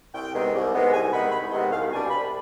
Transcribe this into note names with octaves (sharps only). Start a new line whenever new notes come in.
C2 G5
C3 D#3 G#3 B3
C2
C3 D#3 G#3 B3
C2 G#5
C3 D#3 G#3 B3 B5
C2 B5
C3 D#3 G#3 B3 D#5
C2 F5
B2 G3 D4 G#5
C2 B5